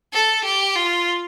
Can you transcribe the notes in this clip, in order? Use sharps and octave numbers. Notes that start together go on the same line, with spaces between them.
A4
G4
F4